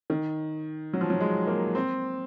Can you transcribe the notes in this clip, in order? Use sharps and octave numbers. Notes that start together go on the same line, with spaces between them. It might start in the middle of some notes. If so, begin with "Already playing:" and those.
D#3
F#3
F3
F#3
G#3
A#3
C4